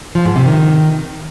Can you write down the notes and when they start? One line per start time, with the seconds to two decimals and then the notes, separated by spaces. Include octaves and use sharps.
0.15 F3
0.25 G#2
0.36 C3
0.46 D#3